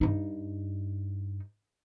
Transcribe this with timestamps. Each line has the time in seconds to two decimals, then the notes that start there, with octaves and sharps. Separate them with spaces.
0.01 G2 D#4